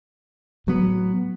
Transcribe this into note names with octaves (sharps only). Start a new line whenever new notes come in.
A2 F#3 B3